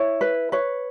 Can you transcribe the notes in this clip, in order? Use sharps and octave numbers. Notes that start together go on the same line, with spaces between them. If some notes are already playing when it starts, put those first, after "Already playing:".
Already playing: E4 C#5
B4
B4 C#5